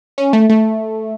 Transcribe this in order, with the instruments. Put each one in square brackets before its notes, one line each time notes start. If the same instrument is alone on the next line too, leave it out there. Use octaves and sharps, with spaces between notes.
[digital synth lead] C#4
A3
A3